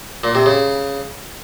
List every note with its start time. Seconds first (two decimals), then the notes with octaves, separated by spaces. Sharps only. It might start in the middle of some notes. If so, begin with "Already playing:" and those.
0.24 A#2
0.35 C3
0.46 C#3